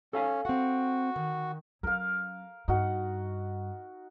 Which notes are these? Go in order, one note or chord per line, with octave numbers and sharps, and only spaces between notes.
C#4 A4 F5 G#5
C4 F#4 F#5
D#3
F#3 C#4 A#4 F5
G2 D#4 F#4 F#5